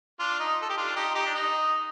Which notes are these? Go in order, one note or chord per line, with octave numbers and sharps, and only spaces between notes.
D4 F4
D#4
A4
G4
D4 F4
D#4 G4
D#4 G4
D4
D#4